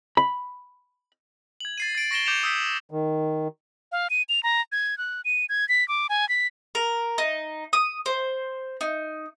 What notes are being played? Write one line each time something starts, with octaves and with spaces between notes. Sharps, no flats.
B5
G#6 F#7
A6 C7 D#7
A6 D7
C#6 A#6 D7 E7 G7
D6 G6 A#6 C#7 E7 F7
D#6 E6 G6 B6 D7
D#3
F5
D#7
F7
A#5
G#6
F#6
D#7
G#6
B6
D6
G#5
B6
A#4
D#4
D#6
C5
D#4